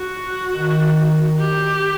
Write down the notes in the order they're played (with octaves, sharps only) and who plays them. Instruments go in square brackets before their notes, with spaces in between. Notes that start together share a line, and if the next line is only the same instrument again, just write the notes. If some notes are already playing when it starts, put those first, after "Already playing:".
Already playing: [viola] F#4
[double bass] D#3
[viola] G4